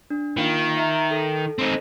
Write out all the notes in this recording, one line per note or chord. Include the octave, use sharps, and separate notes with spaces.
D4
D#3 A#3 F4 F5
E5 A#5
A4
C4 D#4